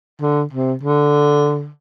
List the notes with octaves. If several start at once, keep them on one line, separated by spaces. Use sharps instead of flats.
D3
C3
D3